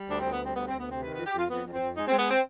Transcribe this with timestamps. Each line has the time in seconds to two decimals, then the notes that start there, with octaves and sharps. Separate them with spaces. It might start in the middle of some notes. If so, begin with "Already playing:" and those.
Already playing: G3
0.10 D2 D4
0.20 C4
0.24 D2
0.32 B3
0.40 G3 C4
0.56 D2 B3
0.67 C4
0.71 D2
0.79 B3
0.87 C3 C4
1.02 D#3 B4
1.14 B4
1.19 F2
1.26 G4
1.34 F2 F4
1.50 F2 B3
1.65 F2
1.73 C4
1.80 F2
1.96 G#3 D#4
2.08 C4
2.12 G#3
2.19 B3
2.31 C4